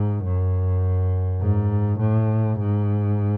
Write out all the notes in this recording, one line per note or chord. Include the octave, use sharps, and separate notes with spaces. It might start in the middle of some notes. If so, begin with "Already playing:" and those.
Already playing: G#2
F#2
G#2
A2
G#2